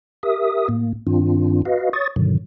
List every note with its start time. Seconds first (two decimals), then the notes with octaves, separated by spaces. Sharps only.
0.23 G4 A#4 E5 D#6
0.69 A2 A#3
1.07 G2 D#3 C4 D4 F4
1.65 F#4 B4 D#5 F5
1.93 C#5 C#6 D#6 A6
2.16 G2 B2 D3 D#3 F#3